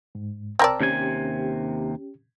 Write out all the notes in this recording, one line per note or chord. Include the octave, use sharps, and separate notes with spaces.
G#2
C2 C4 A#4 D5 A5 E6
D#2 C3 C#4 G4 G#5